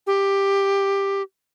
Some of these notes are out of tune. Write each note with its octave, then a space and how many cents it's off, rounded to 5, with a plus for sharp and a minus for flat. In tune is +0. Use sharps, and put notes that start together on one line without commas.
G4 +10